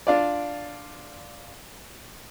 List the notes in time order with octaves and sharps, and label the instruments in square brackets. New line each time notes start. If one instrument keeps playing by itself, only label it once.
[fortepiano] D4 F4 D5